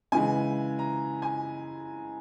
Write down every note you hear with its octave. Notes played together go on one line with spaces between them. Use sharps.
C#3 E3 G#3 G#5
A#5
G#5